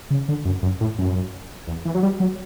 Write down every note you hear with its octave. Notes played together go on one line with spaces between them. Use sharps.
C#3
D3
F#2
F#2
A2
F#2
E2
E3
F#3
G3
F#3